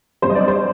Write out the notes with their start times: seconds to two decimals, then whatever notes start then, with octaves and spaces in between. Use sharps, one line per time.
0.22 G2 F#3 C5
0.30 D#5
0.35 D5
0.48 C5